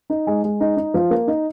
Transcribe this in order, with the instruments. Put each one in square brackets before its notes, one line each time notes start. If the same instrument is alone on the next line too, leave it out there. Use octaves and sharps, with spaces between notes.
[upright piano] D#4
G#3
G#3
D#4
D#4
F3
A#3
D#4